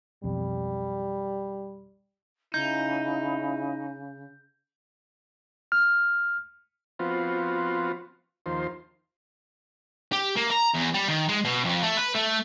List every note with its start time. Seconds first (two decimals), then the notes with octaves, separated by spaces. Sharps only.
0.24 B1 F2 G3
2.54 C#3 D#4 E4 G6
5.72 F6
6.99 F3 B3 C4 F4 F#4
8.46 D#2 F3 C5
10.12 G4
10.36 A#3
10.50 A#5
10.74 E2
10.94 G3
11.09 D#3
11.29 G#3
11.44 B2
11.64 F2
11.83 A3
11.97 B4
12.15 A3